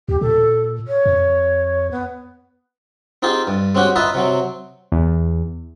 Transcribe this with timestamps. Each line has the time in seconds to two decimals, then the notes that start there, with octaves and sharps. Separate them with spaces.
0.08 D#2 G4
0.21 A#2 A4
0.88 C#5
1.06 F2
1.91 B3
3.22 C4 D#4 F4 G4 G#4
3.47 G2
3.75 G#3 C4 C#4 F#4 G4
3.96 F4 B4 D#5 E5 A#5
4.14 C3 F#3 C4
4.92 E2